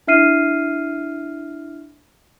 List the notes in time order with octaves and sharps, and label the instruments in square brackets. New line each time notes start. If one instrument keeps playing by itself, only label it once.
[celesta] D4 E4 E5 F6 C7 D#7